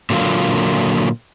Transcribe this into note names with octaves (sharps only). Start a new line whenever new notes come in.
A#2 D3 F#3 A#3 F4